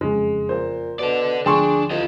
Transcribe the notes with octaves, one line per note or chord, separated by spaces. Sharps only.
F#1 F2 G#3 C#4
A#2 C5
B2 A4 D5
D2 F3 D4 G#4 G5 C6 C#6
C2 F4 D#5